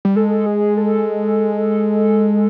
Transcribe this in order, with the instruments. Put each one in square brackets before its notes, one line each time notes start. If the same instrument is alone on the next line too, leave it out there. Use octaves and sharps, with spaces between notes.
[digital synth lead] G3
[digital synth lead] G#3 [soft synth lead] A4
[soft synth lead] G#4
A4